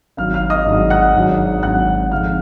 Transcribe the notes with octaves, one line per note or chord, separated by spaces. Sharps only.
G#1 G#2 F#3 D4 F5 F6
F5 F6
D#5 D#6
G#1 G#2 F#3 D4
F#5 F#6
G#1 G#2 F#3 D4
G#1 G#2 F#3 D4 F#5 F#6
F2 D3 G#3 D#4 F5 F6